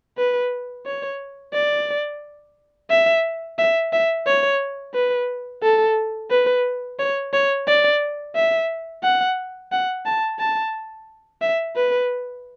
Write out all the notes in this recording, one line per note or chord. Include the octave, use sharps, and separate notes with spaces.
B4
C#5
D5
E5
E5
E5
C#5
B4
A4
B4
C#5
C#5
D5
E5
F#5
F#5
A5
A5
E5
B4